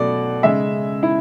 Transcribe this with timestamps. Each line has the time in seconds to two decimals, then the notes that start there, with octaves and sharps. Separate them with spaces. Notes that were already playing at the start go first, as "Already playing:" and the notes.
Already playing: B2 F#3 A3 D5
0.43 C#3 G#3 E5
1.03 E4